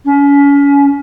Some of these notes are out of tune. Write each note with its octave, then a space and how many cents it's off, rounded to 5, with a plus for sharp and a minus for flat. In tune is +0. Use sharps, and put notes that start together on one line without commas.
C#4 +35